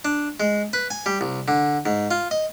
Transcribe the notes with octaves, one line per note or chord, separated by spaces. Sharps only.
D4
G#3
B4
G#5
G3
C2
D3
G#2
F4
D#5